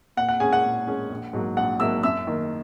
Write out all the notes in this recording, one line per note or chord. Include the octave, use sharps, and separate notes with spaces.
A#2 F#5
F#5
G#3 C#4 G#4 G#5
F#5
A#2
G#3 C#4
A#1
G#2 F#3 A#3
A#1 F#5
G#2 F#3 A#3 E5 E6
F#2 E5 E6
D#3 A#3